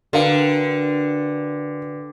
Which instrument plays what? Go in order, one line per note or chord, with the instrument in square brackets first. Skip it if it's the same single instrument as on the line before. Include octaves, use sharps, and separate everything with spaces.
[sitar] D3 [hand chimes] F#4 B4 G5 [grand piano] A#4 F5